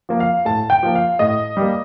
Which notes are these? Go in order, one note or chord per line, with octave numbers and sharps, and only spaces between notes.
F3 A#3
F5
A2 A5
G5
F3 A#3
F5
A2 D#5
G3 A#3